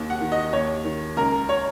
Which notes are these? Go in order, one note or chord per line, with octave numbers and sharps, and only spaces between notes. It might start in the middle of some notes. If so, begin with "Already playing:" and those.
Already playing: D#2
F#5
D#3
D#5
D#2 C#5
D#3
C#2 A#4
C#5